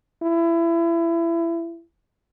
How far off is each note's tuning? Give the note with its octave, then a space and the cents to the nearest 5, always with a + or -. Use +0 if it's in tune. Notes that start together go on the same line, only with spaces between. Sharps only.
E4 +25